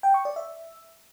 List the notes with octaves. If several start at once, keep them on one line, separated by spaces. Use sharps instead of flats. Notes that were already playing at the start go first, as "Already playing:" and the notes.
G5
C#6
D5
E5